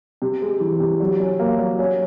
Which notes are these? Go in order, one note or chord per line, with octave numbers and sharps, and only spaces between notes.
C3
G#3
E3
C3
F#3
C#4
A#3
F#3
C#4